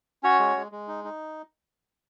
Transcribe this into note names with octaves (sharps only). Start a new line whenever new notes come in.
C#4 F#4 C#5
G#3
G#3
G#3
D#4
D#4